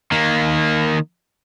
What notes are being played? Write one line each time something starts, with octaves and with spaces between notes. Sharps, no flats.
D#3 A#3